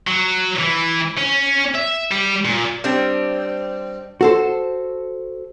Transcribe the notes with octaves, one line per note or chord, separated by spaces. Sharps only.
F#3
E3
C#4
E5
G3
A#2
G3 C4 D4
F#4 A4 C5